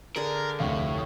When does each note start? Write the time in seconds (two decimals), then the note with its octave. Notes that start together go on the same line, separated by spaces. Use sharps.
0.16 D3 G#4 A#4 B5
0.60 F1 D2 A2 F5